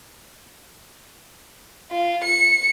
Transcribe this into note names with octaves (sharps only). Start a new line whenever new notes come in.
F4
C#7